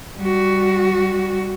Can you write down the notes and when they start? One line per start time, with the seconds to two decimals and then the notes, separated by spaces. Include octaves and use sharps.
0.18 G3 F#4